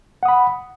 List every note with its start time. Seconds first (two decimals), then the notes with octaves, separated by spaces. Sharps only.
0.23 F#5
0.26 D#6
0.28 B5